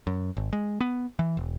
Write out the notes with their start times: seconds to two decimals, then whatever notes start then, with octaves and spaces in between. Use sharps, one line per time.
0.07 F#2
0.37 G#1
0.53 G#3
0.81 B3
1.19 E3
1.37 E1